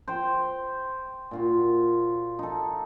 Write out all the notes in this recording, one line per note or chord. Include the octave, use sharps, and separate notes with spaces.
C5 G5
A#2 F4 F#4
D#4 A4